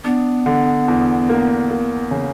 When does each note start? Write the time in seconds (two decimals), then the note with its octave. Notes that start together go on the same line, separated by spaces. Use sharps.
0.04 B3 D4
0.46 D3
0.88 E2
1.29 A#3
1.70 A#3
2.11 C#3